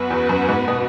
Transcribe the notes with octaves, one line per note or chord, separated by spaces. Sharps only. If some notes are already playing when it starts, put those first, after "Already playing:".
Already playing: F#2 B3 F#4 B4
E2
F#2
G#2
B2